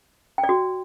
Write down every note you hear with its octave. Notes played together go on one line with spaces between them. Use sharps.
G5
D5
F#4